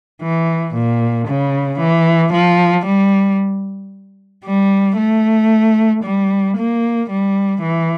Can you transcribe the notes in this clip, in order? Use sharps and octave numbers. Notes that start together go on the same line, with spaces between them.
E3
A#2
C#3
E3
F3
G3
G3
A3
G3
A#3
G3
E3